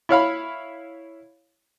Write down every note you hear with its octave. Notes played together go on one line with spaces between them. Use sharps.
E4 C#5 F5 B5